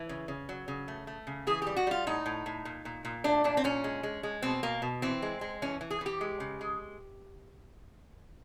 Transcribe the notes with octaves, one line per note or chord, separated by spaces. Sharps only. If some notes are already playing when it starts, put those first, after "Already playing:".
Already playing: E3
C#3
C#3
F#3
C#3
A3
A3
C#3
E3 G#4
G3 G4
F#4
G3 F4
A2 D#4
A2
A2
A#2
A#2
A#2
A3 D4
A#2 D4
C4
A#2 C#4
G#3
G#3
G#3
B2 C4
B2 A#3
B2
E3 C4
G#3
G#3
E3 C#4
E3
G#4
E3 G4
G#3
C#3
G#3